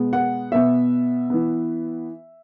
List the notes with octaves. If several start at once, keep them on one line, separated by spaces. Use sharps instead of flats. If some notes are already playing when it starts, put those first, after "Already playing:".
Already playing: B2 G#3 B3
F#5
B2 B3 E5
E3 B3